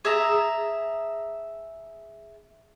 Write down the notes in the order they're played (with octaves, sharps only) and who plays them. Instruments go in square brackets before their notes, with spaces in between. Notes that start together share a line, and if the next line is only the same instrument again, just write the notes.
[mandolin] G#4 E5 A5 A#5